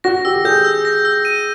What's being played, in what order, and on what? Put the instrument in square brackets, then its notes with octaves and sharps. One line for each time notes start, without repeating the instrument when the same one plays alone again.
[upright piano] F#4 [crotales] A#6
[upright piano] G4 [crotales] E6
[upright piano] G4
[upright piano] G#4 [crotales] G6
[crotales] E6
A#6
E6
D#7